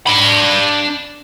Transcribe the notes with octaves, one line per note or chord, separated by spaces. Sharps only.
D4 B5